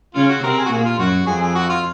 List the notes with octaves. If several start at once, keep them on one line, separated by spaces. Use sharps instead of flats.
C#3 C#4 F4
F#4
C3 C4 A#4
G#4
F#4
A#2 A#3 G#4
F4
F#2 F#3 F#4
F2 F3 G#4
G#4
F#4
F4